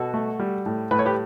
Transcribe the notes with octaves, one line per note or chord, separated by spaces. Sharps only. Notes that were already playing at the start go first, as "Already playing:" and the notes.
Already playing: B2 F#4 A4
A3
G3
A2
A2 B4
C#5
G4 B4